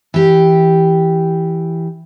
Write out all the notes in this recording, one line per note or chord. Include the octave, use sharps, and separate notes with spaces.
E3 G4